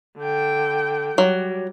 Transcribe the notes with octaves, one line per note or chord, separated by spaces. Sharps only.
D3 G5
F#3 G3